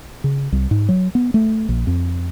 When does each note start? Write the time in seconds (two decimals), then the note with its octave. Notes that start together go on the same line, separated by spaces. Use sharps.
0.24 C#3
0.52 C2
0.71 G#2
0.89 F#3
1.15 B3
1.34 A3
1.69 A#1
1.87 F2